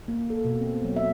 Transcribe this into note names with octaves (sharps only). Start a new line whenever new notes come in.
A#3
A4
B2
C4
F#3
E5